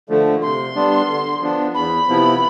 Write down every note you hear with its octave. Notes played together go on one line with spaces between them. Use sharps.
D3 F3 A3
C3 C6
G3 B3 D4
D3
F3 B3 D4
E2 B5
C3 F3 B3 E4